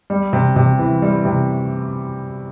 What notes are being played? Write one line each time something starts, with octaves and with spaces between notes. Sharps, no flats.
G3
C3
C3
E3
G3
C3